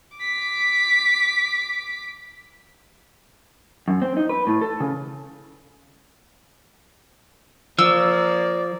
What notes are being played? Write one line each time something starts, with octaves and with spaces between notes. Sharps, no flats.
D6 B6
F#2
C4
D#4
B4
A2
A4
C#3
F3 A#3 D5 E6